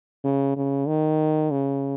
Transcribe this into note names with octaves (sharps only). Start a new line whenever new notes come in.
C#3
C#3
D#3
C#3